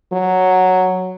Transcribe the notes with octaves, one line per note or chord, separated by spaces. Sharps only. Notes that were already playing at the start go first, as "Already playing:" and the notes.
F#3